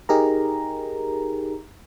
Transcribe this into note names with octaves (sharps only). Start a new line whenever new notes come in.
D#4 G4 G#4 A#4 A#5